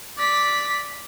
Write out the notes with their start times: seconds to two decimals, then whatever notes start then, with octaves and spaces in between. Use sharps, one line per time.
0.18 D5 B6